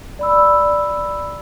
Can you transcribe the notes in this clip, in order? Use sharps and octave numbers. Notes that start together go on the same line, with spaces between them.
D5 B5 E6